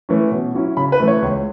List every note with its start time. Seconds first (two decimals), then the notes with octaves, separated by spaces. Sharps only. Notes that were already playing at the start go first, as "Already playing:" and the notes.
0.09 E3 A3 C#4
0.31 B2
0.54 F#3 C#4 E4
0.77 C#3 B5
0.92 B4
0.99 E3 A3
1.08 C#5
1.22 C#2